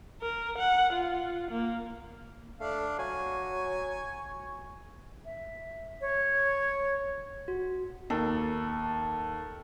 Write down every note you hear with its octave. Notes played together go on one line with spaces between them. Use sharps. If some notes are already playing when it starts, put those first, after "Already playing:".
A#4
F#5
F4
A#3
A3 D4 F5
F#3 G#5 C#6
E5
C#5
F#4
D#2 A4